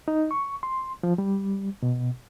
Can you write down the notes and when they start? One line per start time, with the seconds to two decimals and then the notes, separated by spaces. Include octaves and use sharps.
0.08 D#4
0.31 C#6
0.63 C6
1.03 F3
1.18 G3
1.83 B2